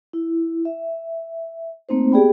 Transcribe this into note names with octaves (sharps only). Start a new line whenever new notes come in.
E4
E5
A3 A#3 C4 D#4 C5
B3 G4 G#4 D5 G5 B5